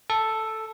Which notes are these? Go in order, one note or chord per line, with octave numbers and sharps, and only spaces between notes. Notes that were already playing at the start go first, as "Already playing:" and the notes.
A4